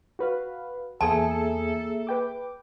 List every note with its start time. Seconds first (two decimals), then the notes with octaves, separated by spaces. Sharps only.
0.19 F#4 B4 F5
1.01 E2 A#3 G#4 A4 E5 G#5 A5 D#6
2.07 B4 G5 D6